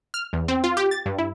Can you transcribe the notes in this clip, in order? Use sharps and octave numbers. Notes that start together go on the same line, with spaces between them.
F6
E2
C4
F4
G4
A6
G2
E4